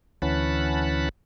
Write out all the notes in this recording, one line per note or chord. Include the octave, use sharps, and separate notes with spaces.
D2 E3 C#4 F#5 A5 B5